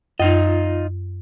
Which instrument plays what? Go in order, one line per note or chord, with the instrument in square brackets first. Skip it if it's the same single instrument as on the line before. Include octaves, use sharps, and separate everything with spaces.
[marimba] F#2 [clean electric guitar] D#4 F4 D#5